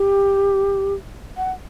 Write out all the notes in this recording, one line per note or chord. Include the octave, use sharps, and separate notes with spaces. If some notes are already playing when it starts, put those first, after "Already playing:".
Already playing: G4
F#5